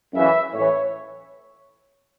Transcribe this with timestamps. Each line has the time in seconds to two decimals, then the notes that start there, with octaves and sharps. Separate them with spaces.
0.14 F#2 C#3 E3 E5
0.53 A2 E3 C#5